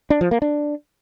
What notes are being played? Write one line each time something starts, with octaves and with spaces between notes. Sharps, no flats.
D4
F3
A#3
D4